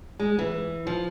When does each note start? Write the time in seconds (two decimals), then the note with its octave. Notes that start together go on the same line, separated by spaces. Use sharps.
0.20 G#3
0.39 E3
0.87 F3